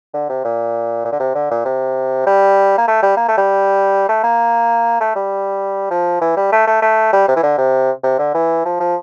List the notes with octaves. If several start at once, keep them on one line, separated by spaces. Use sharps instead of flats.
D3
C3
A#2
A#2
D3
C3
D3
A#2
C3
G3
A#3
A3
G3
A#3
A3
G3
A3
A#3
A3
G3
F3
E3
G3
A3
A3
A3
G3
C3
E3
D3
C3
C3
D3
E3
F3
F3